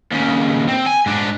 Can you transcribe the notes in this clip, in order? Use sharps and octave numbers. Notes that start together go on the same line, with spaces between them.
D#2 C#3
C4
G#5
G#2 D4